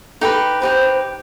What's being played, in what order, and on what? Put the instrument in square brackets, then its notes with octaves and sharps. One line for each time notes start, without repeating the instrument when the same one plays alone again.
[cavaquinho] D#4 G4 B4 [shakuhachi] A4
[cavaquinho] D#4 G4 B4 [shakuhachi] C5